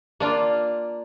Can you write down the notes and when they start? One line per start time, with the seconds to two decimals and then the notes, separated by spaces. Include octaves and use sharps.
0.20 A#3 D4 F4